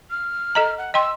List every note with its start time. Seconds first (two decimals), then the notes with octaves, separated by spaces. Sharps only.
0.11 F6
0.55 A4 D#5 A#5
0.78 F#5
0.94 D#5 G5 C6 E6